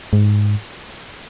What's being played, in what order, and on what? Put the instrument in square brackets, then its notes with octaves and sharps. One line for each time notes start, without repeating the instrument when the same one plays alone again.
[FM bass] G#2